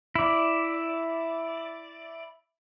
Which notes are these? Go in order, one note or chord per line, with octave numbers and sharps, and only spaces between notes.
E4 D5